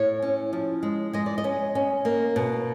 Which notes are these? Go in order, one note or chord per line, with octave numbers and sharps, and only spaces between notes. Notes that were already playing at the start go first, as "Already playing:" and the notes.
Already playing: A2 C#5
C#4
F3
G#3
G#3 D#5
D5
D#5
C#4
C#4
A#3
B2